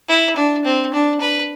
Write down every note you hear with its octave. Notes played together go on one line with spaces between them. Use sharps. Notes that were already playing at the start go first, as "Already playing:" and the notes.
E4
D4
C4
D4
B4